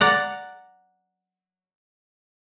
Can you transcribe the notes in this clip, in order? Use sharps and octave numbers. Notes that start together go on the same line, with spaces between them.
D5 F#5 A#5